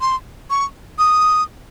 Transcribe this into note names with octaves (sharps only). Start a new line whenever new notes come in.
C6
C#6
D#6